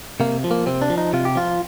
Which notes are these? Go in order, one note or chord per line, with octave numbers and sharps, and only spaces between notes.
C3 A#3
F3
A#3
C3 C4
D4
F3
D#4
C3 F4
G4
F3 F4